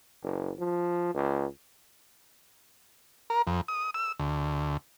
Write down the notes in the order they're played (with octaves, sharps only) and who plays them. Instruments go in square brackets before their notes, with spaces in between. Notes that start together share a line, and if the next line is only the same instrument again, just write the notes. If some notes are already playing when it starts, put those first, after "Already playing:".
[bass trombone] F#1
F3
C#2
[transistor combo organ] A#4
F2
D#6
E6
D2